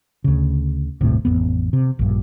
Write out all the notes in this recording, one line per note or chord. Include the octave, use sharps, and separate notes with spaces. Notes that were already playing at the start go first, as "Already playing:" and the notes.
D2 C#3
G1 D#2 A2 C3
A1 F2 A2 B3
C3
A#1 G2